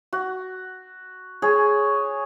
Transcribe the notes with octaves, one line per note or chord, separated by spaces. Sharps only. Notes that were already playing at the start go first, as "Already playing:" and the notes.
F#4
G#4 C#5